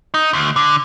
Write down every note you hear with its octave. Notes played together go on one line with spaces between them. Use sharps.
D#4
D2
D3